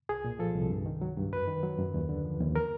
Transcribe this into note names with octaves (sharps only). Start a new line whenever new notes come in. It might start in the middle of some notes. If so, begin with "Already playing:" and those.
C2 G#4
A#2
F3 A4
C2
G2
D#3
F#3
G2
F#2 B4
D#3
F#3
F#2
D#2
D3
F3
D#2
A#4